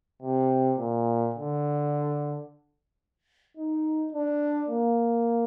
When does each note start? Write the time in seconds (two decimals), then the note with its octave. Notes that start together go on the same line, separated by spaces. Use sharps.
0.22 C3
0.78 A#2
1.34 D3
3.57 D#4
4.13 D4
4.69 A#3